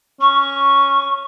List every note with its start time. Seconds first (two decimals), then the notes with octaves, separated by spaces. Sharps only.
0.21 C#4 C#6